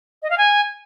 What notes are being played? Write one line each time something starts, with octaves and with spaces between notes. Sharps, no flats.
D#5
F5
G#5